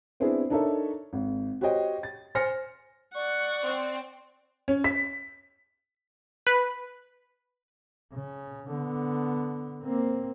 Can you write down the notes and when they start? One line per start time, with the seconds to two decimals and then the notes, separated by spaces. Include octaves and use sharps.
0.20 B3 C4 D4 E4 G#4
0.50 D4 D#4 A4 A#4 C#5 E5
1.13 G#1
1.61 F#4 G4 C5 C#5 D#5 G5
2.03 A6
2.35 C5 G#5 F6 A#6 C#7
3.15 D5 F#5 C#6
3.63 C4
4.68 C#4
4.84 B6
6.47 B4
8.13 C#3
8.70 D3 B3
9.82 A#3 C4